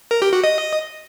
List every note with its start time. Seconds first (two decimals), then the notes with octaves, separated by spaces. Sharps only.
0.11 A#4
0.22 G4
0.33 F#4
0.44 D#5